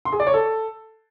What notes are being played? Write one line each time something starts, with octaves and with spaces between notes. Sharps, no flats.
C6
G#4
D5
C#5
A4